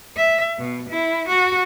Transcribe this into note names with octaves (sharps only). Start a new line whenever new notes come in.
E5
B2
E4
F#4